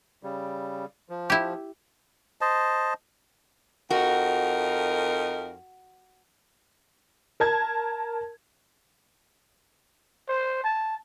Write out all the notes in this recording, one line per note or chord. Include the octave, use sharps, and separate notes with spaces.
C#3 G3
F3
E4 G4
C5 D#5 A5
F2 D#4 F#4 A#4
A#4 A5 G#6
C5
A5